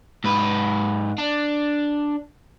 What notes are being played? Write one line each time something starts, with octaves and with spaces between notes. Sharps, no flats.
G#2 B4
D4